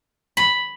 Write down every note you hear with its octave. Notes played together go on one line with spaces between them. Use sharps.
B5